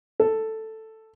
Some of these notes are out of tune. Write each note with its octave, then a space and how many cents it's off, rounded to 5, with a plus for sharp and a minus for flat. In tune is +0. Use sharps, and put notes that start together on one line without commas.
A4 +5